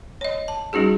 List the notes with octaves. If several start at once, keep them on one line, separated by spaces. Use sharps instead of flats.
C#5 D#5
A5
G3 C#4 D#4 F#4 G#4